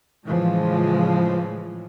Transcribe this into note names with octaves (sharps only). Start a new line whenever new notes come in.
A2 C#3 E3 F3 G#3